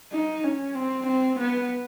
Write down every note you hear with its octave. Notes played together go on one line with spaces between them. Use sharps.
D#4
C#4
C4
C4
B3